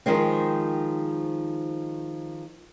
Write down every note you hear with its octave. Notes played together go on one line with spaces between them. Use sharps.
D#3 F3 G#3 C4